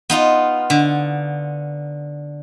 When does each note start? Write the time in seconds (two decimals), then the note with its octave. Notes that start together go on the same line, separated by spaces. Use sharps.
0.10 B3 D#4 F4
0.70 D3